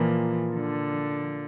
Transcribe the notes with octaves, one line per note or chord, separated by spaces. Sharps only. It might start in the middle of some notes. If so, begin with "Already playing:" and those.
Already playing: A#2 E3 F3 A#3
D3